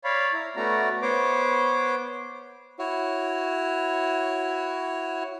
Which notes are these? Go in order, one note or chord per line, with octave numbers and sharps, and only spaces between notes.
C#5 D5 F5 B5
E4 A#5
A3 B3 C#4 F#4 D5 A#5
B3 C5 C#5 D6
E4 F#4 C#5